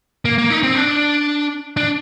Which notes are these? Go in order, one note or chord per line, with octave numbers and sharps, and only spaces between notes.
A#3
A#3
D#4
C4
D4
D4